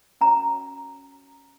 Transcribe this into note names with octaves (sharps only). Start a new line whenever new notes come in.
C#4 F#4 C#5 A#5